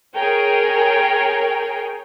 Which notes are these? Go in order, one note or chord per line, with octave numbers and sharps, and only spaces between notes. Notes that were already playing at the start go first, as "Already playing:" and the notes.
G#4 A#4 C#5 G5